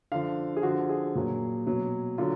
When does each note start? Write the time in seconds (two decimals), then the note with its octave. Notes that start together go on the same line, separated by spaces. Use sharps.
0.12 D3 F3 F5
0.57 G#4
0.63 D3 F3 F#4
0.89 G#4
1.15 A#2 F#3
1.67 B2 F#3
2.18 D3 F#3 F4